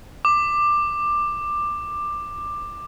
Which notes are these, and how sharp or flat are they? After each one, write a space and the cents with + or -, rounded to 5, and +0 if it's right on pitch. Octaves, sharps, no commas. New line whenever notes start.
D6 +15